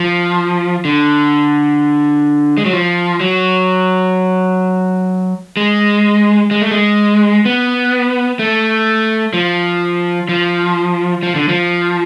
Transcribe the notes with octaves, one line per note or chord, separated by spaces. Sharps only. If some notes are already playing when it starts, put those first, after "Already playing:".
Already playing: F3
D3
G#3
F#3
F3
F#3
G#3
G#3
A3
G#3
B3
A3
F3
F3
F3
D3
F3